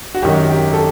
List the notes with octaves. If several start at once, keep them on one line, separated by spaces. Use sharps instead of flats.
F#4
G#1 F#2 D#3 F#3 G4
G4
A4